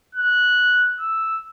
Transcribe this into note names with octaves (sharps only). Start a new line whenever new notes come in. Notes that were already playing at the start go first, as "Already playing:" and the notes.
F#6
E6